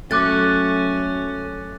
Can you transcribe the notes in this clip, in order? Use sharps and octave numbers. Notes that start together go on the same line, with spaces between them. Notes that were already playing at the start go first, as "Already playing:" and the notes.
F#3 A3 C#4 D6 F#6 A6